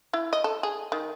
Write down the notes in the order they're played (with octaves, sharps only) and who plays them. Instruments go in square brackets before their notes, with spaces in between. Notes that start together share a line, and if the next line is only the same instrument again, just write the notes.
[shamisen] E4
D#5
A4
G#4
D#3